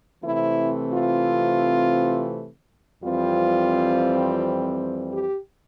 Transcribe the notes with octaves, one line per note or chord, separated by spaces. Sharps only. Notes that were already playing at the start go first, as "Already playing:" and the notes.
C3 E3 A3 C4 E4
F4
F2 E3 G3 C4 F4
G4